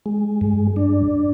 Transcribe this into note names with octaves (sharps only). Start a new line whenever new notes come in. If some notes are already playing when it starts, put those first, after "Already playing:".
G#3
G2
D4